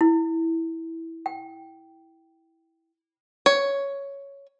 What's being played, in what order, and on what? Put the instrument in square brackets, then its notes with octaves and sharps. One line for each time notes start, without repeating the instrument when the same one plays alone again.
[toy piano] E4
G5
[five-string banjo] C#5